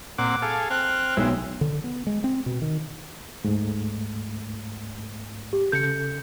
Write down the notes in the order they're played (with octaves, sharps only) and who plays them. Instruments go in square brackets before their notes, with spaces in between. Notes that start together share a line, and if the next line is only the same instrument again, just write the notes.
[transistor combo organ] A#2 C4 F#5 [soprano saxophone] D6
[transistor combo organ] G#4 A4 F5
[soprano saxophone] C4 [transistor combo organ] F6 [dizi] F#6
[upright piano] B1 [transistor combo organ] G#3 E4
[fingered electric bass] D3
B3
G#3
C4
B2
D#3
[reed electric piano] D2 G#2 A3
[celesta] G4
[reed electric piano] C#3 A4 [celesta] G6 C#7